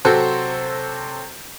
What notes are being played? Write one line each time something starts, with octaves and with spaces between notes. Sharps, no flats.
C3 F#3 C4 F#4 A4 C5